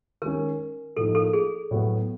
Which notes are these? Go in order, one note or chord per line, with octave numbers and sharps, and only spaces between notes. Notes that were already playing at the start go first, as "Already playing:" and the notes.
D#3 G#3 C#4 A#4
A2 F3 A#3 D#4 A4
A4
G#4
A2 F#3 B3